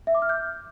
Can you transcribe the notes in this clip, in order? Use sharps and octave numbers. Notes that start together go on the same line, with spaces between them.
E5
D6
F6
G6